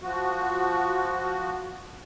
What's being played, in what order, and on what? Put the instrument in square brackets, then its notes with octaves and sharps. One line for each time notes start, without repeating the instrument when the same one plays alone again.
[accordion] F3 F#4